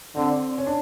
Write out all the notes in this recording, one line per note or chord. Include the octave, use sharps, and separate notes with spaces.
D3 C4
C#4
D4